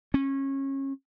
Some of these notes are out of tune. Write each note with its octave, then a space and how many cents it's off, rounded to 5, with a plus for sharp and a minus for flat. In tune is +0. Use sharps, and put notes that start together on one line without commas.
C#4 -25